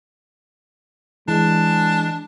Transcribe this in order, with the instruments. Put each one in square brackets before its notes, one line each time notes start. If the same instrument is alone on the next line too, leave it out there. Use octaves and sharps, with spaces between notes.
[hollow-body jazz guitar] E3 [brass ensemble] G#3 [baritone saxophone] D4